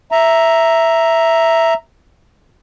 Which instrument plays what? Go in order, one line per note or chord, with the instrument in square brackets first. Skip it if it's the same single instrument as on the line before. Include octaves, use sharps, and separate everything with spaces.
[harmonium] E5 A#5